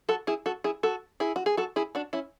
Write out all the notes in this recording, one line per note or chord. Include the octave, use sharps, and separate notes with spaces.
F#4 A4
E4 G#4
F#4 A4
E4 G#4
F#4 A4
E4 G#4
F#4
G#4
F#4 A4
E4 G#4
D4 F#4
C#4 E4